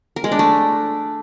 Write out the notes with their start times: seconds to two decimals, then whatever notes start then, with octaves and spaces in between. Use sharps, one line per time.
0.16 A#4
0.24 G#3
0.32 D4
0.39 A3